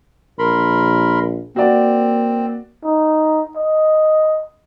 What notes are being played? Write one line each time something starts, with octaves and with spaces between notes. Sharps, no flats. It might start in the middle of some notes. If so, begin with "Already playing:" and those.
A#1 A#4 B5 C6
A#3 C4 F#4 D5
D#4
D#5